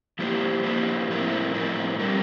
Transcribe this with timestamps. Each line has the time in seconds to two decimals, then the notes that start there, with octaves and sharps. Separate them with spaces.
0.19 F3 A#3 E4 G4 C5
0.64 F3 A#3 E4 G4 C5
1.09 A2 F3 C4 E4 A#4
1.54 A2 F3 C4 E4 A#4
1.98 D3 G3 C4 G4 A#4